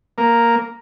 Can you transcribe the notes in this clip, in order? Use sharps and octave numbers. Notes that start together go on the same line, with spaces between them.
A#3